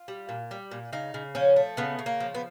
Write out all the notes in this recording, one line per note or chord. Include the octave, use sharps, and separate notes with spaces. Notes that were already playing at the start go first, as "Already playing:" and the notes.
Already playing: F4
G3
A#2
G3
A#2
C#3 D#4
C#3
F3 C#4
A3
C#3 B3
C#3
A#3
F3
B3